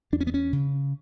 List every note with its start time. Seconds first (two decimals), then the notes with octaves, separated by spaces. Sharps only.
0.12 E2 D4
0.21 C#4
0.27 B3
0.34 C#4
0.53 C#3